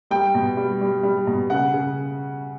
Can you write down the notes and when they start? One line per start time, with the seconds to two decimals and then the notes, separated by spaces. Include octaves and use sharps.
0.10 G3 G5
0.34 B2
0.57 G3
0.81 G3
1.03 G3
1.27 B2
1.50 C#3 F#5
1.74 C#3